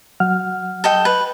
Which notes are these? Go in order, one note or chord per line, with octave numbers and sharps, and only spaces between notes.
F#3 F#5 F6
A4 D#5 G5
B4